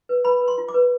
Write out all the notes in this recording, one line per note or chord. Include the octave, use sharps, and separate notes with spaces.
B4
B4 B5
B4
C6
F4
D6
B4